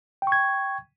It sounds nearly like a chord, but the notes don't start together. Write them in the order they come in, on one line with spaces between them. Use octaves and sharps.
G5 C#6 G#6